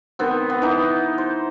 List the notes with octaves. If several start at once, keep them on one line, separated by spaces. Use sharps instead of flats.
D#3 B3 C4
B3
E3 D#4
C5